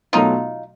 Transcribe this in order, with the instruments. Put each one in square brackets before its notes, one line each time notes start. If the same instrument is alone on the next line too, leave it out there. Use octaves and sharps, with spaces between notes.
[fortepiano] B2 F#3 A3 [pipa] D#4 F4